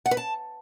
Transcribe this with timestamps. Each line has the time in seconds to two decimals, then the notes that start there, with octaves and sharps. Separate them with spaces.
0.06 F#5
0.11 B4
0.17 A5